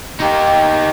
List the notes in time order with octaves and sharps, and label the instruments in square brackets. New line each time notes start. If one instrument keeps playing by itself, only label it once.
[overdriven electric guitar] D#4 G4